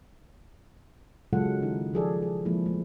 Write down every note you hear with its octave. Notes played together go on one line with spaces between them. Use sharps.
C#3 F#3 G#3 F4 A4 F#5
D#3 D#4 E4
F3 G#4 A4 D5
G#4
E3 F3 G#3 A#3 E4
A3